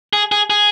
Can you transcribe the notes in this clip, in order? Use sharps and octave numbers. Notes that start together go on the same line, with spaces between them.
G#4
G#4
G#4